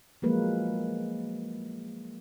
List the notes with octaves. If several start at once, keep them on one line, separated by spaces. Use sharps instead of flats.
F3 F#3 G#3 A#3 B4